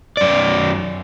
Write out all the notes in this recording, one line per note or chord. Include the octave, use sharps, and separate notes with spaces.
F#2 D5